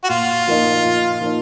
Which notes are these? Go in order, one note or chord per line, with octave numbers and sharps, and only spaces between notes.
F#4
A#2 F4
F3 A#3 D#4
A#2
F3 A#3 D#4